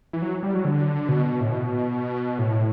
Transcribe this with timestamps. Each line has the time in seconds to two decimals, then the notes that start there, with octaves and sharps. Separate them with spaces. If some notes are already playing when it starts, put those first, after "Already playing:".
0.13 E3
0.22 F#3
0.43 G3
0.54 F#3
0.65 D3
1.09 B2
1.41 A2
1.51 B2
2.39 A2